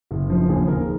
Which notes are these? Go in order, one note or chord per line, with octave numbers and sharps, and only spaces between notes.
F#1
F3
D#2 G#4
D#2 A#4